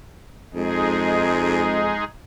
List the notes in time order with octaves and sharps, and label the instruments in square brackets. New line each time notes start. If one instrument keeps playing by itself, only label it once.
[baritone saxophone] F2 [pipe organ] G#3 D#4 G#4